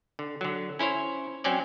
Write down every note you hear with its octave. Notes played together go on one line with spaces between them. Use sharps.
D3
D3 F#3
C#4 E4 C5 C#5
F#3 C4 C#4 D5